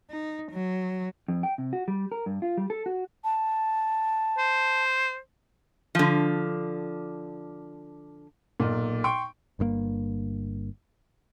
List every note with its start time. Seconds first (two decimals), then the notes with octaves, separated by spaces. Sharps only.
0.10 D#4
0.52 F#3
1.28 F2
1.43 G5
1.58 C3
1.73 F#4
1.88 G3
2.12 A#4
2.26 G2
2.42 F4
2.57 G3
2.70 A4
2.86 F#4
3.24 A5
4.38 C5
5.95 D3 F3
8.60 B1 A#2
9.04 G5 C6 C#6 D7
9.59 G1 G2 C#3 A#3